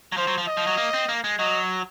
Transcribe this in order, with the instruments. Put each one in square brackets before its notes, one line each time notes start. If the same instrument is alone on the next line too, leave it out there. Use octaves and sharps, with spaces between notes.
[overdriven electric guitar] F#3
[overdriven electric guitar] F3 [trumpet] C5
[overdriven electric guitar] F#3
F3
[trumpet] D#5
[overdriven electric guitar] F3
F#3
A#3
C4
A#3
G#3
[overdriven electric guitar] F#3 [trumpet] D#5